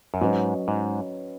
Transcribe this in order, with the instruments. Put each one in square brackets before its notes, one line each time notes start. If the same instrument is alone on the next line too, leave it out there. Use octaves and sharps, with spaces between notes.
[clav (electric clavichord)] F#2
[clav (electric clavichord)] G#2 [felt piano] F#3 C#4 B4 D#5
[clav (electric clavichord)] G#2